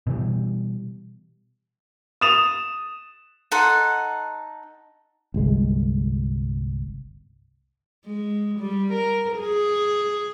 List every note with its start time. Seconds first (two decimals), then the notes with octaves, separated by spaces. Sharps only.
0.07 B2 E3 G3
2.21 D#6 A6 E7 F7
3.52 D#4 A4 F#5 C6
5.34 G1 C2 G#3
8.06 G#3
8.58 G3
8.93 A#4
9.38 G#4